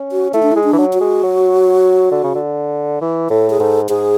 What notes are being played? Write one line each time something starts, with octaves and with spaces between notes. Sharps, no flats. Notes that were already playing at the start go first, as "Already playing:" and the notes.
Already playing: C#4
F#4
A3 E4
D4
E4
G#3
D4
E3
F#3
F#4
G#3
F#3
D3
C#3
D3
E3
A2 A4
G#4
G#2 A4
G#2 G#4